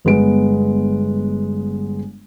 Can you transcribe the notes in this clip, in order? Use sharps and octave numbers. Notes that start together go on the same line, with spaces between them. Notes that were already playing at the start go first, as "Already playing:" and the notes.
G1 G#3 B3 D7